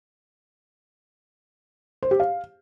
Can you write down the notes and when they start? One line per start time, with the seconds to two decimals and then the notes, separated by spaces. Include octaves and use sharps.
2.03 C5
2.11 G4
2.20 F5